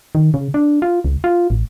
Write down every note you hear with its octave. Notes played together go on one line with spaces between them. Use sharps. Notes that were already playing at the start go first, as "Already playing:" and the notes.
D#3
C#3
D4
F4
C#2
F4
A1